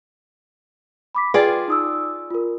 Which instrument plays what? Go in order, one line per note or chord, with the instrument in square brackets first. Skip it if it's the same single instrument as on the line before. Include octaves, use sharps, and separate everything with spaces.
[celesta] B5 D6 B6
[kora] F4 G#4 D5 [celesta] B4 G5
[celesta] D#4 D#6 E6
F4 A#4